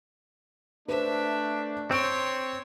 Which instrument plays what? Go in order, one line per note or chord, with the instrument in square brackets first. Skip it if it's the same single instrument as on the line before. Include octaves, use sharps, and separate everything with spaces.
[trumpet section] A3 D4 [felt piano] B4 C5 [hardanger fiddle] E5
[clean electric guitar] C4 [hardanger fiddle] C#5 C6 [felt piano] C#6 D7